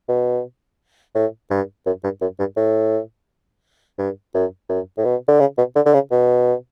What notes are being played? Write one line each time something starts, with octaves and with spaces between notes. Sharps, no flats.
B2
A2
G2
F#2
G2
F#2
G2
A2
G2
F#2
F#2
A2
B2
D3
C#3
B2
D3
D3
C#3
B2